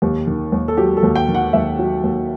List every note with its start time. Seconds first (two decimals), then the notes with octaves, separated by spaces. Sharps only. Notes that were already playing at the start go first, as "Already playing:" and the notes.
0.02 D#2 G4
0.27 D#3
0.52 D#2
0.68 A4
0.77 F#3 G4
0.97 A4
1.03 D#2
1.16 G5
1.29 D#3
1.34 F#5
1.53 D#2 E5
1.79 F#3
2.03 D#2